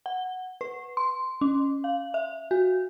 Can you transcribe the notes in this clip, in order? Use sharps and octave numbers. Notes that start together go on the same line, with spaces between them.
F#5
B4
C6
C#4
F5
E5
F#4